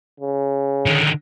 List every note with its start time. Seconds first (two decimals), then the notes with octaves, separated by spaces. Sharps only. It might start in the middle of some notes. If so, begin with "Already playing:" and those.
0.20 C#3
0.86 D3 D#3